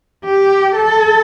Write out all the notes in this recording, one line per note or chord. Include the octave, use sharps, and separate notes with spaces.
G4
A4